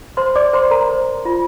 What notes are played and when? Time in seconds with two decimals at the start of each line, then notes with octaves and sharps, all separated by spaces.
0.17 C5 C6
0.35 D5 D6
0.53 C5 C6
0.71 A#4 A#5
0.89 C5
1.25 F4